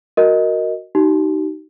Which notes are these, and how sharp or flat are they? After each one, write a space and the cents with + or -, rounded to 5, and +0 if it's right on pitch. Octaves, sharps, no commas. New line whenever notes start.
F#4 +0 A#4 +0 D#5 +10
D#4 +0 G4 -45